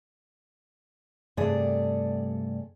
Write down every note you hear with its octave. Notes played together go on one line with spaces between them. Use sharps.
G2 C3 A3 G#4 D5